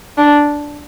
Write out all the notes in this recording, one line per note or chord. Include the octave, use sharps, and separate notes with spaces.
D4